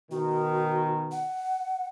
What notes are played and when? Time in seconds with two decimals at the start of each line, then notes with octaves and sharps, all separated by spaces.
0.11 B2 D#3 F#4
1.12 F#5